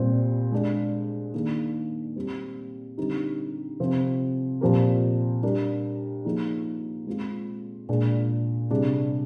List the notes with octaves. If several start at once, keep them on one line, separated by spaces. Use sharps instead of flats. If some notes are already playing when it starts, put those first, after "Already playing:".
Already playing: A#2 G3 C4
G#3 D4 G#4
D#3 A#3 D4 G#4
G3 C4 G4
D3 G3 C4 D#4 G4
C3 F3 C4
A#2 F3 C4 G4 A#4
G3 D4 G4 A#4
F3 A#3 D#4 G#4
G#3 C4 F4
A#2 G#3 D4 G#4
C3 G3 D4 G#4